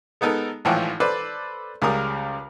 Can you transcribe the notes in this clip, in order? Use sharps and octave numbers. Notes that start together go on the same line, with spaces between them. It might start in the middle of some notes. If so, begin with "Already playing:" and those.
G#3 B3 D#4 A4 A#4
G#1 A2 E3 F3 F#5 G5
A4 B4 C5 D5
C#2 C#3 G3 A#4 D#6